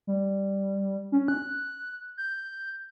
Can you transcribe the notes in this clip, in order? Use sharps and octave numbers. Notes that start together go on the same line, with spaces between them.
G3
C#4
F#6
G6